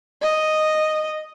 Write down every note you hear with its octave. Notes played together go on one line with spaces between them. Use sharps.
D#5